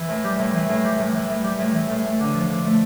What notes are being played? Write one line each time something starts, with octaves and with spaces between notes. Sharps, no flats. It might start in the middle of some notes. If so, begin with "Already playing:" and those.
Already playing: E3
A2
G3
A2
E3
A2
G3
A2
E3
A2
G3
A2
E3
A2
A3
D3
F3
D3
A3